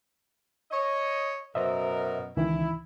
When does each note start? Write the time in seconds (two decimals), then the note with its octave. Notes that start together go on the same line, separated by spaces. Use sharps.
0.71 C#5 D#5
1.55 F#2 B2 A#4 C5 D#5 E5
2.37 C#2 D#3 E3 E4